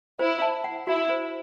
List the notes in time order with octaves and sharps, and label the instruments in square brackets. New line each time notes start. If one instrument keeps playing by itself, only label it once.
[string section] E4 [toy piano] C5
[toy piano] A5
F#5
[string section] E4 [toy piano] F#4
[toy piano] C5